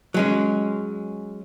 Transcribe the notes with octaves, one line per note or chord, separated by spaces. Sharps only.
F#3 G#3 C#4